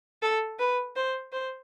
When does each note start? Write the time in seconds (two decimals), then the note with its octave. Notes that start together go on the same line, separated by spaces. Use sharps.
0.22 A4
0.59 B4
0.96 C5
1.32 C5